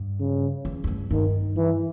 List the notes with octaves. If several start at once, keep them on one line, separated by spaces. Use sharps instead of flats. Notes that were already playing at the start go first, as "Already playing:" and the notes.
Already playing: G2
C#3
E2
E2
G2
G2 D#3
E3